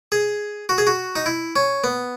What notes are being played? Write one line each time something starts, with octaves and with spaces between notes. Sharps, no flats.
G#4
F#4
G#4
F#4
D#4
E4
C#4
B3